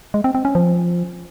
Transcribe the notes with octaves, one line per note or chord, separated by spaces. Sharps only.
G#3
C4
C4
C#4
F3